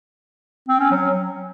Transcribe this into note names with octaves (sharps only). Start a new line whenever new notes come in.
C4
C#4
F#3